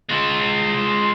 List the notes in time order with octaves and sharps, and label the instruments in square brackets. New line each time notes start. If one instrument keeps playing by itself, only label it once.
[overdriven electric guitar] G#3 F4